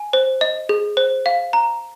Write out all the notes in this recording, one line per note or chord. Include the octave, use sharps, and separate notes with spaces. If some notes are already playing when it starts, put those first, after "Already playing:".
Already playing: G#5
C5
D#5
G#4
C5
F5
A#5